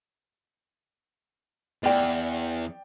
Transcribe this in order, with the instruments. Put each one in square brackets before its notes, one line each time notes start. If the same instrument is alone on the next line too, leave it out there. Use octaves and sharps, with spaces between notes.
[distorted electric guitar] E2 [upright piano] D5 G5